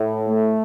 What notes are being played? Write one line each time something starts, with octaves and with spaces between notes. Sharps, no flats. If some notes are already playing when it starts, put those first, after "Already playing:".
Already playing: A2
A3